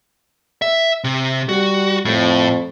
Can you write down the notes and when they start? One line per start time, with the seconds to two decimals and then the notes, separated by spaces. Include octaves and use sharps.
0.62 E5
1.04 C3
1.49 G3 F#4
2.05 F2 A2